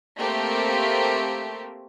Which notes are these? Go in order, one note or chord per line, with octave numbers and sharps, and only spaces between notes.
A3 A#3 C4 G4